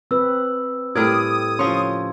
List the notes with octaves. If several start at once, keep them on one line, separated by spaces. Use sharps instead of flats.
C4 B4 E6
A2 G4 A#4 D5 D#6 G#6
F3 C#4 C#5 C6